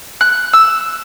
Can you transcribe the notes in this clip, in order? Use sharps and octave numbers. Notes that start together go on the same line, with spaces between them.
F#6
E6